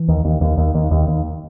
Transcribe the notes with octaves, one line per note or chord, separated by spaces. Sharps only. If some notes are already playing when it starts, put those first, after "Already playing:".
Already playing: E3
D#2
D#2
D#2
D#2
D#2
D#2
D#2